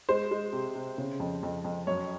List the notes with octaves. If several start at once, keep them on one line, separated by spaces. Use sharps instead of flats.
G#3 C5
G#3
C3
C3
C#3
F2
F2
F2
F#2 C#5